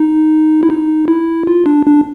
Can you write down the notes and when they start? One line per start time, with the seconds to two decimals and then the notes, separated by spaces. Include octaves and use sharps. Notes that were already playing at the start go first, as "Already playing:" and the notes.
Already playing: D#4
0.63 E4
0.70 D#4
1.08 E4
1.47 F4
1.66 D4
1.86 D4